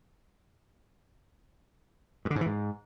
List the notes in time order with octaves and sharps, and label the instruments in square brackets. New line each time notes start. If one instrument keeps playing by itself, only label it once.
[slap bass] G2
D3
G#2
E3
G#2